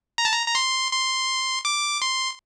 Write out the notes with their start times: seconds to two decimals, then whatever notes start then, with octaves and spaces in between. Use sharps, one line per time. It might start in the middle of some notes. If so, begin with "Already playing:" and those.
0.18 A#5
0.25 A5
0.33 A#5
0.47 A#5
0.55 C6
0.92 C6
1.65 D6
2.02 C6